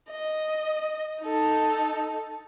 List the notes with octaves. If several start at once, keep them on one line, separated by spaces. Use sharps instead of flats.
D#5
D#4 A4